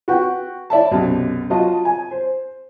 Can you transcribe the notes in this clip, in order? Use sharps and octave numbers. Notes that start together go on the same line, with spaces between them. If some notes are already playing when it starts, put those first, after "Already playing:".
F#4 B4 F#5 G5
E4 D5 E5 A5
B1 F#2 C3
F#3 F4 D#5 A5
G#5
C5